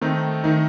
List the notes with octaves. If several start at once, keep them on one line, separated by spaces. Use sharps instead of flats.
D#3 A3 C4 D#4
D#3 A3 D#4